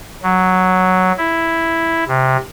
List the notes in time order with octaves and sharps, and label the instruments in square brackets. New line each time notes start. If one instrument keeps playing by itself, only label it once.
[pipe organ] F#3
E4
C3